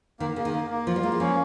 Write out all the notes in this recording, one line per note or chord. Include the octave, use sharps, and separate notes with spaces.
D#3 A#3
C#3 A#3
D#3
A#3
A#3
F3 F4
G3
G#3 A#3
G3
F3 C#4